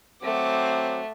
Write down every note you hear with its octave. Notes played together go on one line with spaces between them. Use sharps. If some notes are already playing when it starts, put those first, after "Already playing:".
F#3 A3 C4 F#5 D6